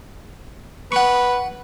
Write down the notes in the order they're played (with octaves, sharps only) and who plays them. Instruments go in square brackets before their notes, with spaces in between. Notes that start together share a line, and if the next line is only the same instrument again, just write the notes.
[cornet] B4 [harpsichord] F#5 C#6